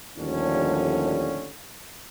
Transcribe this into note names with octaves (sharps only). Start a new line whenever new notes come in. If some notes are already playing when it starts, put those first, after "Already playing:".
D#2 A2 D3 F3 G3 C#4